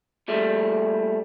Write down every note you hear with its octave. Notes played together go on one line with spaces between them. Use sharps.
A#2 G3 A3